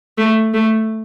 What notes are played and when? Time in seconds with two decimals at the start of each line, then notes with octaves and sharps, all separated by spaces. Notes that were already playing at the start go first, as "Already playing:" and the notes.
0.18 A3
0.54 A3